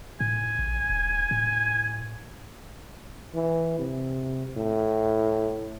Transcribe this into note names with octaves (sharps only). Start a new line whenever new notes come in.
A2 G#5
A1
D#1
A2
E3
C3
A2